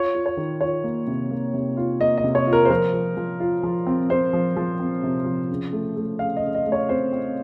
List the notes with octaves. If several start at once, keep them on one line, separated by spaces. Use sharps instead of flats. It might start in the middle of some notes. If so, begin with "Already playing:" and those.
Already playing: F4 C#5
F4
C#5
D#3
F4 C#5
A#3
C3
A#3
C3
F4
A#3 D#5
D#5
C3
C#5
F4
A#4
C5
F3 A#4
F3
F3
F4
F3
C4
C4 C5
F3
F3
C4
C3
F3
C#3
A3
A3
C#3 F5
D#5
C#3
D#5
A3
C#5
C4 C5
C4